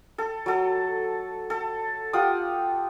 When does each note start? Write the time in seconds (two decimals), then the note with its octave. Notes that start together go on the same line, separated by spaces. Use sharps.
0.18 A4
0.46 F#3 A4
1.50 A4
2.13 F4 G4 F#5 D#6